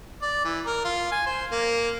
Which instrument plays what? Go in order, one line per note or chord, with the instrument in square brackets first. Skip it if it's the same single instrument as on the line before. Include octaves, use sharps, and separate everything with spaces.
[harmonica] D5
E3
A#4
F4
G#5
C5
A#3